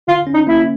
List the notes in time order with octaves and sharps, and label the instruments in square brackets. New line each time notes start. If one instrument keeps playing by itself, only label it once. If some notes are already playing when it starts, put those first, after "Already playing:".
[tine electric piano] D3 [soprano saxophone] F4
[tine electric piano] C#4
[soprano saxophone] D#4
[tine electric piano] A#3 [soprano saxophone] E4